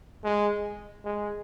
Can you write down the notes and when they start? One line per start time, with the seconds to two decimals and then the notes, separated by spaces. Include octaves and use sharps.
0.24 G#3
1.05 G#3